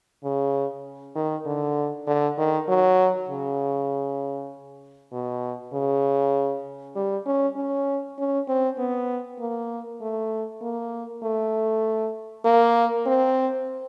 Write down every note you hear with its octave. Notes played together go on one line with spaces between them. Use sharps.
C#3
D#3
D3
D3
D#3
F#3
C#3
B2
C#3
G3
C#4
C#4
C#4
C4
B3
A#3
A3
A#3
A3
A#3
C4